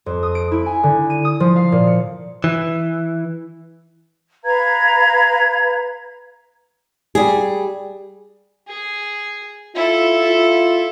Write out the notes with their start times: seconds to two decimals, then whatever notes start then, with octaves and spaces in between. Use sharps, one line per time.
0.06 F2
0.23 D#6
0.35 D7
0.51 E4
0.66 G#5
0.83 D3
1.10 D#7
1.25 D#6
1.40 F3
1.56 F5
1.72 A#2
1.87 C#7
2.44 E3
4.44 B4 F5 A#5 G#6
7.15 G3 G#4
8.68 G#4
9.75 E4 F4 A4
10.27 F4